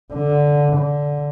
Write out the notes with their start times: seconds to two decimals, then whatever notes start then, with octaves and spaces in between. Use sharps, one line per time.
0.14 D3
0.76 D3